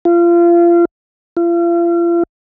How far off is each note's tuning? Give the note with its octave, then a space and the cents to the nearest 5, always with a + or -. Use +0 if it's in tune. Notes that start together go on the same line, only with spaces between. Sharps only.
F4 -30
F4 -40